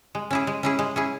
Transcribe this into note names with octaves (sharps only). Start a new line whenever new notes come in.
G#3
C#4 E4 G#4
G#3
C#4 E4 G#4
G#3
C#4 E4 G#4